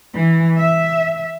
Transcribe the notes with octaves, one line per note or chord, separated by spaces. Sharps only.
E3
E5